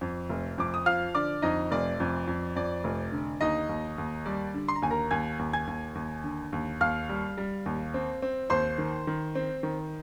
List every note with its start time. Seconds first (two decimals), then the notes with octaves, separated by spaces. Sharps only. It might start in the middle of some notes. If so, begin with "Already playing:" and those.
0.01 F2
0.29 F1
0.58 F2 D6
0.74 D#6
0.86 F3 F5 F6
1.15 D3 D5 D6
1.42 F2 D#4 D#5
1.71 F1 D5
2.00 F2
2.28 F2
2.56 F2 D5
2.84 F1
3.12 D3
3.41 D#2 D#4 D#5
3.69 D#2
3.98 D#2
4.26 G3 D5
4.54 D3
4.68 C6
4.76 A#5
4.82 D#2 G#5
4.91 A#4 A#5
5.11 D#2 G#5 G#6
5.39 D#2
5.53 G#5 G#6
5.67 D#2
5.95 D#2
6.24 D3
6.53 D#2
6.81 D#2 F5 F6
7.09 G3
7.37 G3
7.66 D#2
7.94 C4
8.22 C4
8.50 D#2 C5 C6
8.78 D#3
9.07 D#3
9.35 C4
9.63 D#3